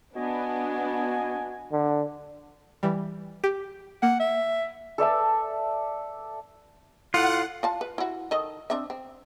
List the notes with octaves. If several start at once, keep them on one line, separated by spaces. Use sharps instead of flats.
B3 D4 F#4 D#5 G#5
D3
E3 G3
G4
A#3 F#5
E5
A4 D5 E5 A5
A2 F4 F#5
F4 F5 A5
B4
E4 F#4
D#3 A4 D#5
C4 D4 E5
C4